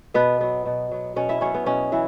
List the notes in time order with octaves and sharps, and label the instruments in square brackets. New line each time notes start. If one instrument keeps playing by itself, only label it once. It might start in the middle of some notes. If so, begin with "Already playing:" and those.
[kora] B2 B3 B4
F#3 B3
B2
F#3 B3
B2 C#4 C#5
E4 E5
F#3 B3 C#4 C#5
B3
B2 C#4
E3 F#3 E4